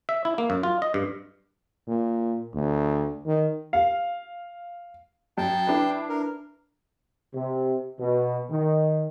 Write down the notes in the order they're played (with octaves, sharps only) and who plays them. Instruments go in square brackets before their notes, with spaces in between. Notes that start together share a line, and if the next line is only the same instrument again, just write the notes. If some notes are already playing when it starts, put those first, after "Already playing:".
[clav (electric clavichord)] E5
E4
A#3
F#2
F4
D#5
G2
[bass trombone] A#2
D2
D#3
[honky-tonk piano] F5
[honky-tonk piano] F#2 [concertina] G5 A5
[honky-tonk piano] D4 E4 B4
[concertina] A#4
[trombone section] C3
B2
D#3